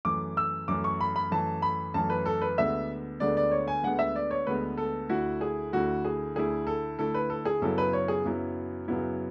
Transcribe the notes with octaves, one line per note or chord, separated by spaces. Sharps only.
F#2 E3 A3 D6
E6
F#2 E3 A3 D6
C#6
B5
B5
F#2 E3 A3 A5
B5
F#2 E3 A3 A5
B4
A4
B4
D2 D3 G#3 B3 E5
D2 D3 G#3 B3 D5
D5
C#5
G#5
D2 D3 G#3 B3 F#5
E5
D5
C#5
D2 D3 G#3 B3 B4
A4
D2 D3 A3 E4 F#4
G#4
D2 D3 A3 E4 F#4
G#4
D2 D3 A3 E4 G#4
A4
D2 D3 A3 E4 A4
B4
A4
G#4
F#2 C#3 F#3 B3 E4 A4
B4
C#5
G#4
F#2 C#3 F#3 B3 E4
F#2 C#3 F#3 B3 E4